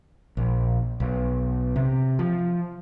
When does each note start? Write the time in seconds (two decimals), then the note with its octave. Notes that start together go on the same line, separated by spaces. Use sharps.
0.37 A#1
1.00 B1
1.76 C3
2.19 F3